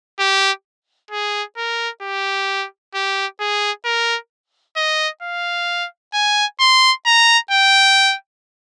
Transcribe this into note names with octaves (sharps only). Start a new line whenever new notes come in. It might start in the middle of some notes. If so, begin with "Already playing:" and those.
G4
G#4
A#4
G4
G4
G#4
A#4
D#5
F5
G#5
C6
A#5
G5